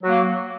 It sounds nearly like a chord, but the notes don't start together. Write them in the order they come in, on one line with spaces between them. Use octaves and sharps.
F#3 F#4 A#3